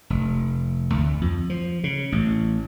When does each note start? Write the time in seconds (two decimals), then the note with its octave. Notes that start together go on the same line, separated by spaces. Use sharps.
0.10 F1
0.94 D2
1.21 F2
1.50 F3
1.84 C#3
2.12 A1